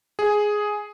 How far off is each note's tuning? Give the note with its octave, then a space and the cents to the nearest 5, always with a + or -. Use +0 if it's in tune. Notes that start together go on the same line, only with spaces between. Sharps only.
G#4 +5